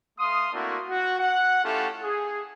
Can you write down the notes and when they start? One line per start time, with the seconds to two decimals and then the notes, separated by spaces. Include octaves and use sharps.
0.19 A3 F5 C6 D#6
0.53 A3 A#3 C4 D4 E4 F#4
0.89 F#4
1.19 F#5
1.64 A3 C#4 E4 F4 G4 A4
2.02 G#4